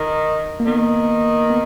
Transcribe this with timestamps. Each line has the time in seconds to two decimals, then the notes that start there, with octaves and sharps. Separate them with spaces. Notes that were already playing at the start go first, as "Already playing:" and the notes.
Already playing: D#3
0.60 A#3
0.66 D#3 B3
1.50 B3